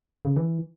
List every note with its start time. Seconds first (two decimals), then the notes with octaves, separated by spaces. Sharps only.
0.25 C#3
0.36 E3